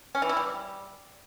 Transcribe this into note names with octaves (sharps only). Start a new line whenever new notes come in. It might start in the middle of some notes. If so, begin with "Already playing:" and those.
C#4
E3
E4
G3